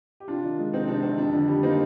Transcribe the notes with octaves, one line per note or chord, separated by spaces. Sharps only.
G4
C3 D4 F4
D#3
G#3
C3 C4 D#4
D#4
C3 D4
D#3 C4
F2 D4
D3
G3
A#3 C4 D#4